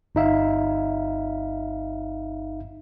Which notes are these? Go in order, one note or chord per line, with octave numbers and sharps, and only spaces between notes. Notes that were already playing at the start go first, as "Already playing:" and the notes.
G1 D#4 E5 F5